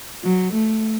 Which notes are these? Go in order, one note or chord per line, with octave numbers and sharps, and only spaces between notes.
F#3
A3